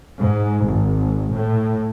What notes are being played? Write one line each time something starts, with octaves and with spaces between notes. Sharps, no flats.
G#2
G#1
A2